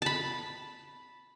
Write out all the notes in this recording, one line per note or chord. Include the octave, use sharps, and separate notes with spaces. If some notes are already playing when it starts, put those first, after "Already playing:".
A5 B5